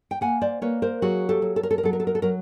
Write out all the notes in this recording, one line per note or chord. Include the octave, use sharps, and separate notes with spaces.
G5
A#3 F#5 G#5
C5 D5
A#3 B4 C#5
A#4 C5
F#3 F#4 G#4
G4 A4
F#3
A4
A#4
A4
A#4
F#3 A4
A#4
A4
A#4
A4
F#3 A#4